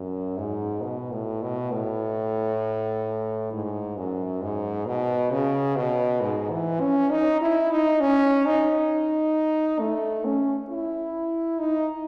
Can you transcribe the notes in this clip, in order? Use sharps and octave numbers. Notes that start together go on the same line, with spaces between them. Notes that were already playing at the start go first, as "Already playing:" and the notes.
Already playing: F#2
G#2
B2
A2
B2
A2
G#2
F#2
G#2
B2
C#3
B2
G#2
E3
C#4
D#4
E4
D#4
C#4
D#4
A3
C#4
E4
D#4